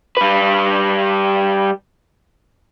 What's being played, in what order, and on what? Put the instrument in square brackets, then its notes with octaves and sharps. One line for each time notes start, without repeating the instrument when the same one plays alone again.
[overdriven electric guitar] G3 B4